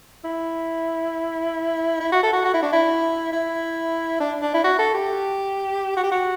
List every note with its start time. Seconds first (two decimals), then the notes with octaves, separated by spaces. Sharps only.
0.24 E4
2.00 E4
2.12 F#4
2.23 A4
2.33 F#4
2.44 F#4
2.54 E4
2.62 D4
2.73 E4
3.32 E4
4.20 D4
4.42 D4
4.54 E4
4.64 F#4
4.78 A4
4.94 G4
5.97 F#4
6.03 G4
6.12 F#4